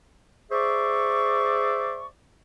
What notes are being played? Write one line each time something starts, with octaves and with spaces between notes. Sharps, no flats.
G#4 C5 D5 E5 C#6